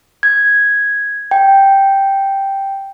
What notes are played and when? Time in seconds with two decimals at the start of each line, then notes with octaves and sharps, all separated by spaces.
0.23 G#6
1.31 G5